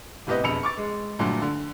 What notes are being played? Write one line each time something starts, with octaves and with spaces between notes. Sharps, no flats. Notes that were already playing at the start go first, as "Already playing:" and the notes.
A2 C3 B3 G4 B4 D#5
E1 F2 B5 E6 C#7 F7
C#6 D6 A6
G#3
G2 A#2 D3 F#3 A3
D3